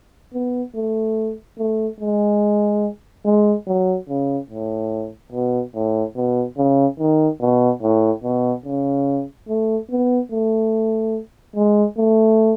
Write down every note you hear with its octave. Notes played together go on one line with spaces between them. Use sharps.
B3
A3
A3
G#3
G#3
F#3
C#3
A2
B2
A2
B2
C#3
D#3
B2
A2
B2
C#3
A3
B3
A3
G#3
A3